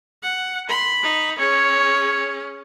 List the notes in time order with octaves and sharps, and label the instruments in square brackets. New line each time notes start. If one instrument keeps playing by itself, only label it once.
[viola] F#5
[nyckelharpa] B5 [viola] C6
[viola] D#4
[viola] C#4 G#4 [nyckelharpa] C#5